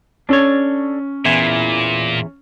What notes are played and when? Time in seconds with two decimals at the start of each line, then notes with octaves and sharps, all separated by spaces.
0.29 C#4 D4 A4 C#5
1.25 E2 A#2 E3 E4